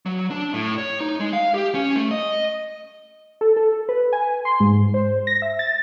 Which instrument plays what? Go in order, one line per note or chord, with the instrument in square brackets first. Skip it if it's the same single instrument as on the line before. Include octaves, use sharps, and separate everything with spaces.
[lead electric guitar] F#3
D4
A2
C#5
D#4
G#3
F5
G4
C#4
A3
D#5
[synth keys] A4
A4
B4
G#5
C6
G#2
C5
A#6
E5
A6